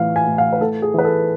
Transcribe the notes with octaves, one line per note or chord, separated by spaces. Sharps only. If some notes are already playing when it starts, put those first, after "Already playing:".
Already playing: A2 E3 F5
G#5
A2
F5
B4
A2 A4
G#4
E3 B4
A4